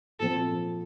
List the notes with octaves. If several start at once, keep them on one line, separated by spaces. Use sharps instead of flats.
A#2 F3 C4 A4